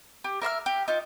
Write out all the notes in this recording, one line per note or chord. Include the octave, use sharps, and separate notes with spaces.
G4
A#4 E5 C6 F6
G4
D#4 F4